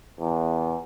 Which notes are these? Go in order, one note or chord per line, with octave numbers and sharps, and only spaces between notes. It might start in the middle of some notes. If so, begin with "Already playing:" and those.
E2